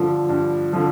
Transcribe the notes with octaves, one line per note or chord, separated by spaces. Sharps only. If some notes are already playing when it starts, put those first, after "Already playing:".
Already playing: G2 D3 F3
G2
D3 F3